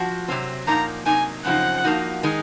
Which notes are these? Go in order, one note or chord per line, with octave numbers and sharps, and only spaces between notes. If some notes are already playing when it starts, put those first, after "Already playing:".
Already playing: F3 F#4
C3 F#3 C4
A#2 F3 A#3 D#4 A#5
C3 F#3 A#3 D#4 G#5
F#2 C#3 F3 C4 D#4 F#5
F3 A#3 D#4 F#4
D#3 G#3 D#4